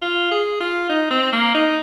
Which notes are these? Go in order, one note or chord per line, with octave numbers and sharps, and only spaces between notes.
F4
G#4
F4
D#4
C4
A#3
D#4